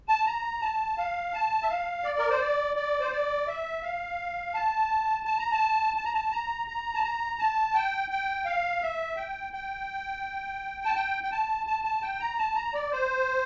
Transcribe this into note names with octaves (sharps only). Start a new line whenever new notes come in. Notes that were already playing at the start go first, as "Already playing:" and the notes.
A5
A#5
A5
F5
A5
E5
F5
D5
A#4
C5
D5
D5
C5
D5
E5
F5
A5
A5
A#5
A5
A5
A#5
A5
A#5
A#5
A5
A#5
A5
G5
G5
F5
E5
G5
G5
A5
G5
G5
A5
A5
A5
G5
A#5
A5
A#5
D5
C5